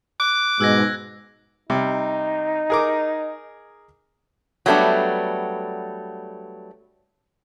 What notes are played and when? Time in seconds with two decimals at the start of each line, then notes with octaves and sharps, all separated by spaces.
0.20 D6 F#6
0.60 G#2 B2 G#3 E6 G#6 A#6
1.70 C3 G3 D#4
2.70 G#4 A#4 D6
4.66 F#3 G3 A3 B3 D4